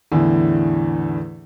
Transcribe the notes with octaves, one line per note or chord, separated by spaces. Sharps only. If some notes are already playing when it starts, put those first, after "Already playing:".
E2 A2 D3